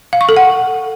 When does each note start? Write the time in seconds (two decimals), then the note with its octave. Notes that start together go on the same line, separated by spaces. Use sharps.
0.13 F5
0.21 C#6
0.29 A4
0.37 F#5